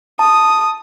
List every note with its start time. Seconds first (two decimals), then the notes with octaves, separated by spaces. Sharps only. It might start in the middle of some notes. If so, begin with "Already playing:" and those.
0.19 A5 D#6